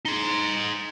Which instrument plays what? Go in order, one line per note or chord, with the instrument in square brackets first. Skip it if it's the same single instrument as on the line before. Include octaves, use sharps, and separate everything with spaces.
[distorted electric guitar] D#4 C6